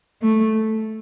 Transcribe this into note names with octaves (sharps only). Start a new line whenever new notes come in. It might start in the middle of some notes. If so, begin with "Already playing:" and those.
A3